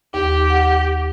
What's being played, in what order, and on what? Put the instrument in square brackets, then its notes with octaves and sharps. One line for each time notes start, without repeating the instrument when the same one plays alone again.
[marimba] D#2 [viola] G4
[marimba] F#5